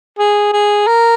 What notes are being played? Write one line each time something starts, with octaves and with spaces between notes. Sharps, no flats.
G#4
G#4
A#4